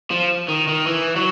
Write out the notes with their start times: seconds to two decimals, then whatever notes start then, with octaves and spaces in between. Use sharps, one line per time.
0.11 F3
0.48 D#3
0.68 D#3
0.87 E3
1.16 F#3